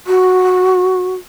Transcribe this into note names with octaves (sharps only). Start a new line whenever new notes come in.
F#4